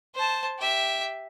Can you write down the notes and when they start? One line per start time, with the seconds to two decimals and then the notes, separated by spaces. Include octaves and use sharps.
0.15 C5 A5
0.58 G4 E5